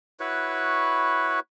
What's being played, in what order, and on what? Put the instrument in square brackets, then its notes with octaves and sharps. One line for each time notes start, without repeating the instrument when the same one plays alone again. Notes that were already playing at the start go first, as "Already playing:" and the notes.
[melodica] E4 F#4 B4 C#5